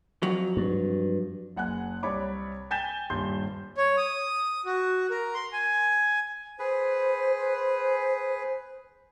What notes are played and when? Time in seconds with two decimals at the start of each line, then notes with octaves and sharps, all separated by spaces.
0.23 F2 F#3
0.57 G2
1.56 F#1 F#5 G#5 F#6
2.03 C2 C#5 D5 B5 D6
2.71 G5 G#5 G6 A6 B6 E7
3.10 D#1 G2 C6 G6
3.77 C#5
3.97 D#6
4.65 F#4
5.10 A#4
5.34 C6
5.53 G#5
6.59 G#4 B4 C5